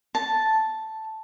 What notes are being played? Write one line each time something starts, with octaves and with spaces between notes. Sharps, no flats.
A5